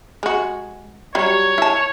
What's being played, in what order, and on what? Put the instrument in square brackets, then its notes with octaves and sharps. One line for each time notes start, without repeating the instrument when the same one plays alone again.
[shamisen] G#3 F#4
[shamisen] F#3 G3 [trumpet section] C#5
[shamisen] E4 A5